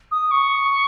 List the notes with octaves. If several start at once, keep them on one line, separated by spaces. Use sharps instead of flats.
D#6
C#6